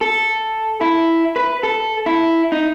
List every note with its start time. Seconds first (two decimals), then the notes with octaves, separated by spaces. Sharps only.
0.01 A4
0.81 E4
1.36 B4
1.63 A4
2.06 E4
2.52 D#4